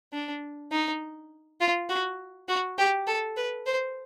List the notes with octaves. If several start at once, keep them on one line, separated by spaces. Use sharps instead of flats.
D4
D#4
F4
F#4
F#4
G4
A4
B4
C5